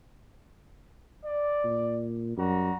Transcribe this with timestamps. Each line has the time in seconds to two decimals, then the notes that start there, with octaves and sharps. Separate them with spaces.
1.24 D5
1.64 A#2
2.37 F#2 G3 F#4 A#5